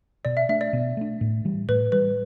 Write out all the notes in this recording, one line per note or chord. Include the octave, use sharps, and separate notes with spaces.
B2 D5
E5
A3 D4 E5
D5
B2
A3 D4
A2
E3 G3
A2 B4
E3 G3 B4